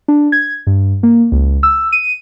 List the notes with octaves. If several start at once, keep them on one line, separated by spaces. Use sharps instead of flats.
D4
G#6
G2
A#3
C#2
E6
D#7